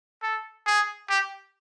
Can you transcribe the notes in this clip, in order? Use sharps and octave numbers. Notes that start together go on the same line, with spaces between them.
A4
G#4
G4